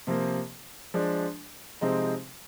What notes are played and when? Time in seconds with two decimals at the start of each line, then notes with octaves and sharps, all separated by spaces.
0.07 C3 F3 A#3
0.94 F3 G#3 D4
1.81 C3 F3 G#3 C4 D#4